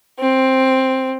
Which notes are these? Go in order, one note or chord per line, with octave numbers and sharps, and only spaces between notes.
C4